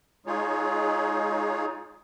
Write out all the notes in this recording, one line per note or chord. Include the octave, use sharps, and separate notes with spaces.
G#3 D#4 F4 G#4 C#5